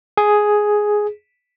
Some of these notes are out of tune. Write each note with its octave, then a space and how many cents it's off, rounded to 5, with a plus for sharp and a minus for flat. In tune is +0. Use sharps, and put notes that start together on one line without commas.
G#4 +5